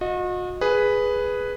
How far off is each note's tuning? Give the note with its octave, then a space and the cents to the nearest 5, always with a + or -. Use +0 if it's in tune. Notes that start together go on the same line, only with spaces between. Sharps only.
F#4 -40 D#5 +0
G#4 +0 B4 +0